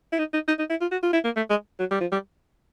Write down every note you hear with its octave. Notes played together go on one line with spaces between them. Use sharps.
E4
D#4
D#4
D#4
D#4
E4
F4
F#4
F4
E4
A#3
A3
G#3
F#3
G3
F3
G3